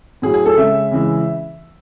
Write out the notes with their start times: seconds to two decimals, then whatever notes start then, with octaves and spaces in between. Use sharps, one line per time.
0.22 A2 F#3 G#4
0.34 G#4
0.46 A4
0.57 C#3 G#3 E5
0.91 C#3 E3 G#3